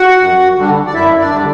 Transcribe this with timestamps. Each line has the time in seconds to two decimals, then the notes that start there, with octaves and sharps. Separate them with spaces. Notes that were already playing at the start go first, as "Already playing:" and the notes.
Already playing: F#4 F#5
0.18 F#2
0.57 D3 G3 D4
0.86 D5
0.94 F#2 E4 E5
1.19 D4 D5
1.32 D3 G3 D4